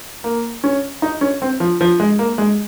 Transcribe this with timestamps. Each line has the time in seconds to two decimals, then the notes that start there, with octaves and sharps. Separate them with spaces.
0.24 A#3
0.64 C#4
1.02 D#4
1.21 C#4
1.42 C4
1.60 F3
1.81 F3
2.00 G#3
2.19 A#3
2.38 G#3